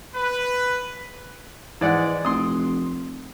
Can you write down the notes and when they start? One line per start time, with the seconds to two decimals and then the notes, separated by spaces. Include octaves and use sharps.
0.15 B4
1.81 G#2 E3 D5 F#5
2.25 F1 C6 D#6